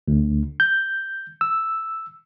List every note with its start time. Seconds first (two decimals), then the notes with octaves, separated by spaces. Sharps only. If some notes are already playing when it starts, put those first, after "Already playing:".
0.08 D2
0.60 G6
1.41 E6